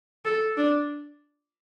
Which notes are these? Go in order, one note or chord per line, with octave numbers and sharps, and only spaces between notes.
A4
D4